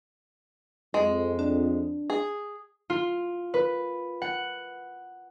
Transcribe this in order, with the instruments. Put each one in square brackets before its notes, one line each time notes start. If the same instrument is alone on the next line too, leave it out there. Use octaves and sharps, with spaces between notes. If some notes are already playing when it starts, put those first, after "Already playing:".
[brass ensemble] F2 [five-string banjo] G#3
[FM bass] D4
[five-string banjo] G#4
[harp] F4
B4
F#5